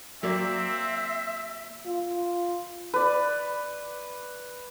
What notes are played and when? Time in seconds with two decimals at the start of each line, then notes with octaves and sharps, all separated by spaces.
0.23 F#3 A#3 C4 D5 E5
1.86 F4
2.94 B4 D5